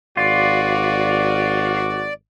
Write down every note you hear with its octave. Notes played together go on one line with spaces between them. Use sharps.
G#1 F4 F#4 D5